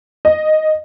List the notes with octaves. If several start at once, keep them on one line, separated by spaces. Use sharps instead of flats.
D#5